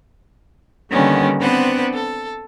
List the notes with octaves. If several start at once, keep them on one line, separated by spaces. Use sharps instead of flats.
D3 D#3 G3 A#3 B3 C#4
B3 C4 D4 B4 C5 F#5
A4